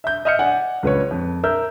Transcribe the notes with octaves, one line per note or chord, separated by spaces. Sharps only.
E5 G6
D#5 E5 F6 G6 C#7
D5 F#5 G#5
C#2 B4 C#5
F2
A#4 E5 E6 G6